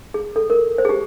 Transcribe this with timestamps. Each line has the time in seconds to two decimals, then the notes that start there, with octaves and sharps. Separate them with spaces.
0.14 G#4
0.36 A4
0.50 A#4
0.78 C5
0.85 G#4
0.89 G4